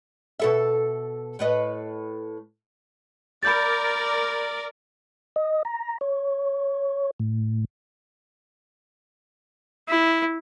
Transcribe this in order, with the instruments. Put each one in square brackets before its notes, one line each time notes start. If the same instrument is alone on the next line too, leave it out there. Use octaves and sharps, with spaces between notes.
[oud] B2 A4 E5
A2 B4 D#5
[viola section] A#4 D5 [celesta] B5 G6 A6
[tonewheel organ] D#5
A#5
C#5
A2
[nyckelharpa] E4